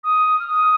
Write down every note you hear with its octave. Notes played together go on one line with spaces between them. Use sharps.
D#6
F6
D#6